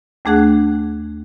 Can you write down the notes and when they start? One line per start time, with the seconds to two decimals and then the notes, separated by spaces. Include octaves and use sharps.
0.25 D#2 A3 D4 G#4 F#5 F#6